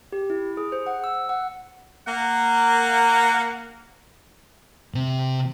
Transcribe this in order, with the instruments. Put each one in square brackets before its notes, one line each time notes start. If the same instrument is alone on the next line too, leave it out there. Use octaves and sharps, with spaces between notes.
[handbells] G4
E4
G#4
C5
F#5
E6
F#5
[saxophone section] A#3 F#5
[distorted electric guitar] C3